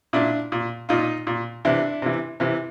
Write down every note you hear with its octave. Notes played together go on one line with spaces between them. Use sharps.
A#2 D4 E4
A#2
A#2 D#4 F4
A#2
C3 E3 D4 E4
C3 E3
C3 E3